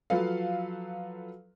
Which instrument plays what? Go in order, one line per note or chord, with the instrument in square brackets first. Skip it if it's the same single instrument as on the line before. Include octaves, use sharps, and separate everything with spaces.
[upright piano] F3 F#3 A4 B4 F5